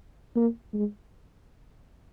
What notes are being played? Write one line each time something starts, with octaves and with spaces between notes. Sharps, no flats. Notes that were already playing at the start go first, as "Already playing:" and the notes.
A#3
G#3